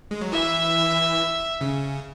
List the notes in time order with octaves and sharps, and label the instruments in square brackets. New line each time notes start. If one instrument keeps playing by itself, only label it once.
[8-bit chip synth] G#3
F#3
[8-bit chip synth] E3 [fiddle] E5
[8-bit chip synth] C#3